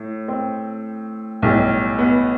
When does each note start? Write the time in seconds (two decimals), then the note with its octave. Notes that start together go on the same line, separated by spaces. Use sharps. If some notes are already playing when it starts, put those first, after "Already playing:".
Already playing: A2
0.28 C4
1.42 B1 A2 G3
1.99 B3